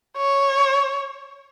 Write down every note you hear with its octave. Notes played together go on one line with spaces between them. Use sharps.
C#5